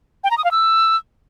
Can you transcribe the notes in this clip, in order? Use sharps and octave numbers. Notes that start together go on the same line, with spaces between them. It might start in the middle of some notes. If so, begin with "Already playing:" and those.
G5
A#5
D#6
F5
E6